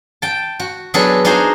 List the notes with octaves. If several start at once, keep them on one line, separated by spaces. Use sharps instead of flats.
G5 A5
F#4
F#3 B3 D4 G#4 A4 B4
D4 D#4 F#4 G#4 C5 D#5